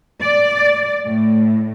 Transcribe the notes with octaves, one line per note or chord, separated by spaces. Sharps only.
D5
A2